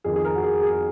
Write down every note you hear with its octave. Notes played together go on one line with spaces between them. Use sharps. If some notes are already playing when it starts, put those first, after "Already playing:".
F2 D#3 G#4
G#4
A#4
F#4
G#4
G#4